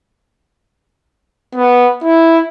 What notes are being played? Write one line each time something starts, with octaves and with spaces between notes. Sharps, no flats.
B3
E4